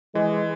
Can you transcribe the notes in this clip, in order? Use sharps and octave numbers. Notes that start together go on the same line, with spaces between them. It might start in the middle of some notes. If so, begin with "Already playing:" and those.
E3 G#3